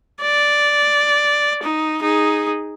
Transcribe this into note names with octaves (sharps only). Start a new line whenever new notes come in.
D5
D#4
D#4 G#4